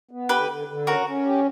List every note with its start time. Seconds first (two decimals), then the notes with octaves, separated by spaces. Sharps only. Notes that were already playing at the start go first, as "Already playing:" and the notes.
0.11 B3
0.29 D3 G4 B4
0.49 D3
0.67 D3
0.86 C#4 F#4 A#4
1.06 C#4
1.25 G4